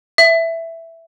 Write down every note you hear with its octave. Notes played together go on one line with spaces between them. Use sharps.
E5